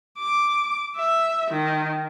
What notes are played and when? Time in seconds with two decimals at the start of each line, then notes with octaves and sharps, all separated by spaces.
0.19 D6
0.97 E5
1.51 D#3